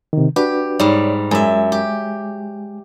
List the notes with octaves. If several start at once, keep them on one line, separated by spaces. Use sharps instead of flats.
C3 D#3
D4 F#4 G4 B4
G#2 G3 C#5 D5
F#2 G#3 E5 G#5
G4